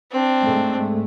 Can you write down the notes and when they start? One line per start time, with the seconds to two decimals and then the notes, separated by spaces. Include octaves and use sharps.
0.11 C4 D4
0.42 G#2 G#3 A3